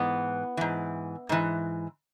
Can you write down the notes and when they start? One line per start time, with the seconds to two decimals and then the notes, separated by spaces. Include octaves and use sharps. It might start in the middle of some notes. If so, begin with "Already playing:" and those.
Already playing: G#2 E3 B3
0.57 G#2 E3
1.29 G#2 E3